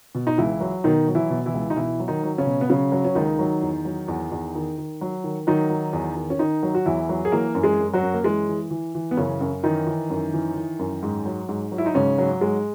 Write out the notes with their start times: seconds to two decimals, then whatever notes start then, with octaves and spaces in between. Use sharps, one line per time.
0.15 B2
0.27 D#4
0.38 C#2 E3 E4
0.61 F#3
0.84 B2 D#3 D#4
1.08 F#3
1.15 E3 E4
1.30 B2
1.46 E3 E4
1.54 C#2
1.70 D#4
1.76 B2 E3 E4
2.00 F#3
2.08 D#3 D#4
2.23 F#3
2.38 C#3 C#4
2.46 B2
2.61 B3
2.69 C#3 F#3 C#4
2.92 F#3
3.05 C#4
3.15 C#2 D#3 D#4
3.39 F#3
3.62 E2
3.85 F#3
4.08 E2
4.32 E2
4.55 D#3
4.78 D#3
5.01 F#3
5.24 D#3
5.47 D#3 F#3 D#4
5.70 F#3
5.93 E2
6.16 D#3
6.30 C#4
6.39 D#3 D#4
6.63 F#3
6.74 F#4
6.86 E2 E3 E4
7.09 F#3
7.25 G#4
7.32 E3 A#3 A#4
7.55 F#2
7.63 G#3 G#4
7.79 F#2
7.94 F#3 F#4
8.02 F#2
8.14 A#3
8.24 E3 G#3
8.48 E3
8.71 E3
8.95 E3
9.11 B3
9.17 F#2 C#3 C#4
9.41 F#2
9.63 D#3 E3 D#4
9.87 E3
10.10 F#2
10.34 E3
10.56 E3
10.79 F#2
11.03 G#2
11.26 F#3
11.49 G#2
11.72 F#3
11.78 E4
11.86 D#4
11.94 G#2 C#3 C#4
12.18 F#3
12.41 G#2 G#3